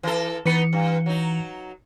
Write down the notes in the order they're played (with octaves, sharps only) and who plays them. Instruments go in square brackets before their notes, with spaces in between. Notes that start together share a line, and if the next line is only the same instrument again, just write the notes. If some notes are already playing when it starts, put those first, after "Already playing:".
[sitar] E3 A4
[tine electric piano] E3 C#7 [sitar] B3 D#4 B4
[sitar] G2
F#3 D#4